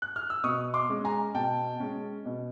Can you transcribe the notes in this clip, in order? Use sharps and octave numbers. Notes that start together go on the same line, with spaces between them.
F#6
F6
E6
B2 C#6 D#6
C6 D6
G#3 C#4
G#5 A#5
B2 G5 A5
G#3 C#4
B2